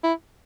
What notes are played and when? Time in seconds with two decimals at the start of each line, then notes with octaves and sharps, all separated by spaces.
0.04 E4